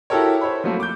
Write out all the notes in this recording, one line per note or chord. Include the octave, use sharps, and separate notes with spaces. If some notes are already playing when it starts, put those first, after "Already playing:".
E4 F#4 G4 A4 A#4 C#5
C5 C#5 B5
F3 F#3 A3 A#3
D6 G6